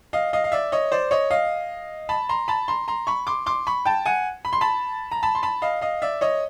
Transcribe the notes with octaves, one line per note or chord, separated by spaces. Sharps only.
D#5 F5
D#5 F5
F5
D5 E5
C#5 D#5
C5 D5
C#5 D#5
D#5 F5
A5 B5
A#5 C6
A5 B5
A#5 C6
A#5 C6
B5 C#6
C6 D6
C6 D6
B5 C#6
G5 A5
F#5 G#5
B5
C6
A5 B5
A#5
A5 B5
C6
A5 B5
D#5 F5
D#5 F5
D5 E5
C#5 D#5